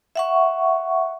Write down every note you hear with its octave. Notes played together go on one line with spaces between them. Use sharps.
E5 F#5 C#6